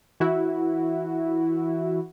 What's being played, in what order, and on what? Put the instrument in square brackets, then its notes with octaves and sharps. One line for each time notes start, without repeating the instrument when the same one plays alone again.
[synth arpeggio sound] E3 E4 F#4